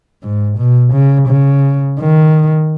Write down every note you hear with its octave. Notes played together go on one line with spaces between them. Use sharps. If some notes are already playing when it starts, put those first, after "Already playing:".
G#2
B2
C#3
C#3
D#3